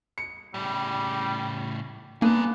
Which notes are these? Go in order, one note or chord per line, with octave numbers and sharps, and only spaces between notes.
C#7
A2 C#3 G3
A#3 B3 D4 G#4 A#4